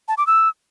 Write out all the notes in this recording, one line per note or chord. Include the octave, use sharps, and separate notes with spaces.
A5
D6
E6